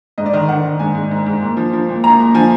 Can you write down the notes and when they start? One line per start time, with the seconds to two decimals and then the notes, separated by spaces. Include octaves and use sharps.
0.18 G#2 D#5
0.26 D5
0.33 D#3 D#5
0.49 D#3 F#5
0.64 D#3
0.79 G#2 G#5
0.95 G#2
1.11 G#2
1.26 G#2
1.42 A#2
1.57 F3
1.73 F3
1.89 A#2
2.04 A#2 A#5
2.20 A#2
2.35 F3 G#5